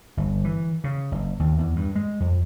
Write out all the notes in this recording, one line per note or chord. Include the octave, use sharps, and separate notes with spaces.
G1
E3
C#3
F#1
D#2
E2
G2
G#3
F2